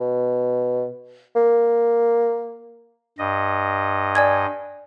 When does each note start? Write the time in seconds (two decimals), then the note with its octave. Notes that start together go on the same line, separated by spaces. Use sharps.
0.01 B2
1.36 A#3
3.18 G2 D#5
4.15 D5 G#5 G#6